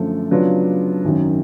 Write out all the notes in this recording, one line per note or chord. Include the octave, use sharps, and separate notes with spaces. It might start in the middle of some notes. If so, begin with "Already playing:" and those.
Already playing: F#2 D3 F3 A3
C#3 F#3 B3 D4 F4
G#1 F#2 D#3 F#3